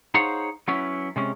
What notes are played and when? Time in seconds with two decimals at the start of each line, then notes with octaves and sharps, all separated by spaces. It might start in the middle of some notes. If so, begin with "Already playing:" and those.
0.14 D#4 G#4 C5 C#5 F5 F#5
0.68 F#3 B3 C#4 E4
1.16 C3 G#3 C#4